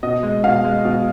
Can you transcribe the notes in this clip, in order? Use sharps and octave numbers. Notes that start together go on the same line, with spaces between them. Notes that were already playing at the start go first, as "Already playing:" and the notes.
B2 D#5
G#3
B2 F5
G#3
B2